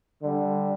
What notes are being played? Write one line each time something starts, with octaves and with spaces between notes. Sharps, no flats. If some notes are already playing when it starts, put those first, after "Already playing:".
D3 G3